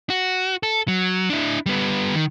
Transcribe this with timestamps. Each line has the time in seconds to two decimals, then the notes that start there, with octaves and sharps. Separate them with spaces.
0.10 F#4
0.63 A4
0.88 F#3
1.30 D4 E4
1.66 G3 B3
2.15 D#3